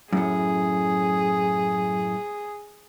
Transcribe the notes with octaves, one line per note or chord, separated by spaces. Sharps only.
F#2 A2 G#4